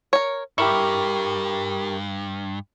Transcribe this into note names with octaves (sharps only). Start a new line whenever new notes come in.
A#4 C#5
G2 E4 G4 A#4 C#6